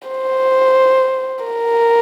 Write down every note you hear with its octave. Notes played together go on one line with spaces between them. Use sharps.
C5
A#4